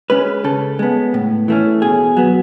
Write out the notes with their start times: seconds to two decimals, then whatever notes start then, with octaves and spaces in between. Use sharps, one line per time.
0.10 G#3 C#4 B4
0.44 C#3 A4
0.79 G#3 B3
1.14 A2
1.48 E3 A3 C#4
1.82 B2 G#4
2.17 F#3 B3